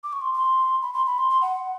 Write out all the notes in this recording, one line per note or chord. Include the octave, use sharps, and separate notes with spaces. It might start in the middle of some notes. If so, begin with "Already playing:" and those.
D6
C#6
C6
C6
B5
C6
B5
C6
C6
F#5